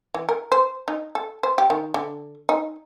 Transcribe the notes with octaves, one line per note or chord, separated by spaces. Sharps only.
E3
A#4
C5
D#4
A4
C5
G4
D#3
D3
D#4